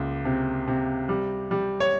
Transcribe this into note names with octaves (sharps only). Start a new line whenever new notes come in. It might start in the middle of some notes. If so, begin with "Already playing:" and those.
Already playing: C#2 A#3
C3
C3
G3
G3
C#5